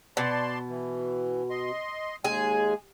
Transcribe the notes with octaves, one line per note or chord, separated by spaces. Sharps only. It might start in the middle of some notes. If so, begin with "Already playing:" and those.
B2 D5 A5 C6
E3
D#5 C6
D#2 G#3 G#4 G#5